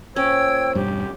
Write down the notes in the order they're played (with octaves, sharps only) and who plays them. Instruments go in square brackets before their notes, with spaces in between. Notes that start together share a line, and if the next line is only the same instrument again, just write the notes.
[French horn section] A#2 C5 [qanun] C#4 [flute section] G5 E6 G#6
[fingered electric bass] E1 G2 [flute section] G4